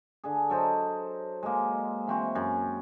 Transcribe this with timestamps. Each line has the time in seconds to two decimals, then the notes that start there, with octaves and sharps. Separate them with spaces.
0.24 D3 G#4
0.50 F#3 A4 C5 D#5
1.43 G#3 A#3
2.07 E3 C4 F#4
2.35 F#2